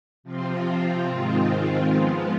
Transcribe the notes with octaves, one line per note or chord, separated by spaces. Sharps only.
C3 F3 C4 F4
G#2 D#3 G#3 C4 F4
F3 G#3 B3 F4